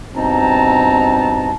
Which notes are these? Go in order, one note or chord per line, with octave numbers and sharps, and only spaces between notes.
G2 B2 C4 D#4 A5 A#5